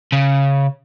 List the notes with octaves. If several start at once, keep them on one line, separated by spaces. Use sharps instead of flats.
C#3